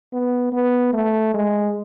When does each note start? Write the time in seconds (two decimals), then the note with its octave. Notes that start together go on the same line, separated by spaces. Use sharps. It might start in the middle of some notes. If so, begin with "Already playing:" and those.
0.13 B3
0.53 B3
0.93 A3
1.34 G#3